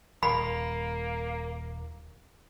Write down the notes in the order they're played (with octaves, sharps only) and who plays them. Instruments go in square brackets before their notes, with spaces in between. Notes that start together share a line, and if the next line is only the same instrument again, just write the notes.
[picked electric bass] D#1 [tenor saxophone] A#3 [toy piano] B5